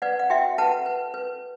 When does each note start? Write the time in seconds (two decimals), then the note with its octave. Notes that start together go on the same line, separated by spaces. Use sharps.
0.02 B4 D5 F#5
0.19 F#5
0.30 F#4 E5 G5
0.58 B4 F#5 A5
0.86 B4
1.14 B4